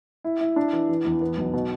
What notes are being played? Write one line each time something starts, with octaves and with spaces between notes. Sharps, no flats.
E4
E4
D4
E3
E3
E2
B3
B1
B2